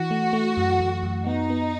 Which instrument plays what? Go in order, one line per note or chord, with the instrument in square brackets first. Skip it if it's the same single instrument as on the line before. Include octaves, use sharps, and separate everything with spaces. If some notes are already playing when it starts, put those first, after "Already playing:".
Already playing: [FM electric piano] E3 [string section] F#4
[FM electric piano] A3
A3
F#2
F#2
F#2
[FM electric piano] B3 [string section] D#4
[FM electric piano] B3